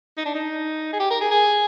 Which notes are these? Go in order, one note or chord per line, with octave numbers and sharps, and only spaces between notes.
D#4
D4
D#4
G#4
G4
A#4
G#4
G#4